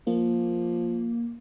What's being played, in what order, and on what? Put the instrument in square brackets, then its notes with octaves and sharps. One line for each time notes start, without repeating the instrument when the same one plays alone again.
[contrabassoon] F3 [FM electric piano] A#3